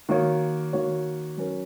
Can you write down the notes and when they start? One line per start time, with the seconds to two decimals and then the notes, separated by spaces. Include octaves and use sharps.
0.09 D#3 A#3 F#4 C#5
0.73 D#3 A#3 F#4 C#5
1.37 F#3 C#4 A#4